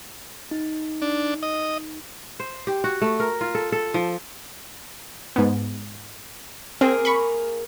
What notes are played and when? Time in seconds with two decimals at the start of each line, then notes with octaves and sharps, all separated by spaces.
0.51 D#4
1.02 D4
1.43 D#5
2.40 C5
2.67 G4
2.84 F#4
3.01 A3
3.20 A#4
3.41 F4
3.55 A4
3.72 A4
3.94 F3
5.36 G#2 B3
6.81 A#3 C4 G#4 A#4
7.05 B5 C#6